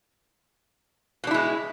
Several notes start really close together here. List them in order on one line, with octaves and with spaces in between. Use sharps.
B2 D4 E4 G#3